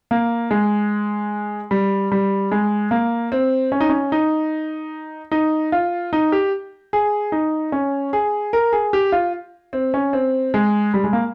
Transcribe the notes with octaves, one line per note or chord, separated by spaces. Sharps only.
A#3
G#3
G3
G3
G#3
A#3
C4
C#4
D#4
C#4
D#4
D#4
F4
D#4
G4
G#4
D#4
C#4
G#4
A#4
G#4
G4
F4
C4
C#4
C4
G#3
G3
G#3
A#3